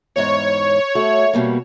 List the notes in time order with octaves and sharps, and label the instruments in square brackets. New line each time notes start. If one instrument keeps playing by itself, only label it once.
[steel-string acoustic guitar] E2 G#2 [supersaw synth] C#5
[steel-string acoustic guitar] A3 F#4
B2 G3 A#3